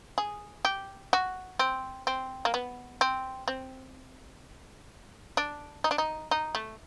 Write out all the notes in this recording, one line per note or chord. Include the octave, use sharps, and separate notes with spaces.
G#4
G4
F#4
C4
C4
A#3
B3
C4
C4
D4
D#4
D4
D#4
D#4
A3